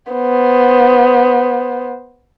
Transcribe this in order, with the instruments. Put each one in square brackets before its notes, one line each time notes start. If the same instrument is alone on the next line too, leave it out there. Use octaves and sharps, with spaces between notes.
[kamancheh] B3 C5